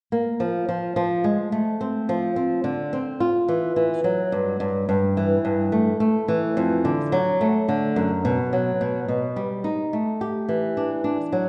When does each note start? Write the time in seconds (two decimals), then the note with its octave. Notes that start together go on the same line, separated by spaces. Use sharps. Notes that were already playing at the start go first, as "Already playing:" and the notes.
0.12 A#3
0.40 F3
0.69 F3
0.96 F3
1.24 G#3
1.52 A3
1.81 C4
2.09 F3
2.36 C4
2.64 D3
2.93 C4
3.20 F4
3.48 E3
3.76 E3
4.04 F#3
4.32 G2
4.60 G2
4.89 G2
5.17 E3
5.45 G2
5.72 A3
6.00 A3
6.28 E3
6.57 F2
6.85 D3
7.12 F#3
7.41 A3
7.69 D3
7.96 F#2
8.25 B2
8.53 F#3
8.81 B2
9.08 B2
9.36 G3
9.64 D#4
9.93 A3
10.21 G4
10.49 E3
10.77 D4
11.04 D4
11.33 F#3